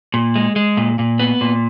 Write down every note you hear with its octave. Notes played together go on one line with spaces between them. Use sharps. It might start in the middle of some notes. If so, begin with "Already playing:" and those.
A#2
G#3
G#3
A#2
A#2
B3
A#2